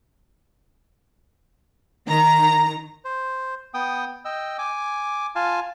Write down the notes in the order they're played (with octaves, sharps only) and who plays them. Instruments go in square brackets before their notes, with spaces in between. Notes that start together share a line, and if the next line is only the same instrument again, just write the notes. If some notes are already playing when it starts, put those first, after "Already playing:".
[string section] D#3 A#5
[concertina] C5
B3 G5 D#6
D#5 G5 E6
G#5 D6
F4 F5 G#5 A5